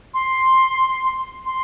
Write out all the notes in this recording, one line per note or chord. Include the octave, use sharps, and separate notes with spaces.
C6
C6